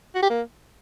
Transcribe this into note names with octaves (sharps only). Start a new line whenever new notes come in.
F#4
G4
A#3